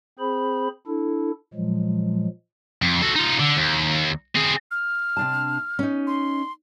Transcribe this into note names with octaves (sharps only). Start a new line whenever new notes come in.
C4 G#4 C5 B5
D4 E4 A4
A#2 F3 F#3 G#3
F2
F#4 A4
D#4 F4
D3
D#2
C4 G#4
F6
C3 D4 A5
C#4 D#4
C6